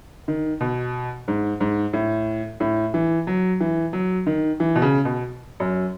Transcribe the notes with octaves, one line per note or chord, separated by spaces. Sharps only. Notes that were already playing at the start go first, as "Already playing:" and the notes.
D#3
B2
G#2
G#2
A2
A2
E3
F#3
E3
F#3
D#3
E3
B2
C#3
B2
F#2